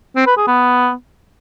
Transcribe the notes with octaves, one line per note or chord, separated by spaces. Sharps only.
C4
B4
G#4
B3